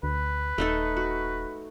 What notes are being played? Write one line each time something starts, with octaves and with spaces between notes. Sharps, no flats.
D2 B4
D#1 A3 D#4 A4
F#4